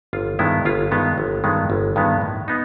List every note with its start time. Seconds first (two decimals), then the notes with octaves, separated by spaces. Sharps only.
0.13 G1 F4
0.39 G2 D#3 G#3 B3 E4
0.65 G1 F4
0.91 G2 D#3 G#3 B3
1.18 G1
1.44 G2 D#3 G#3 B3
1.70 G1
1.96 G2 D#3 G#3 B3
2.22 A2
2.48 B3 D#4